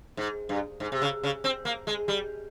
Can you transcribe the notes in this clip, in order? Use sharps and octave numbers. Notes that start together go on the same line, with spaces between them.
G#2
G2
G#2
C3
C#3
C#3
C4
A#3
G#3
G3